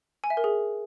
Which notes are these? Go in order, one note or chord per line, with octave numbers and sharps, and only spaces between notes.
G#5
E5
A#4
G#4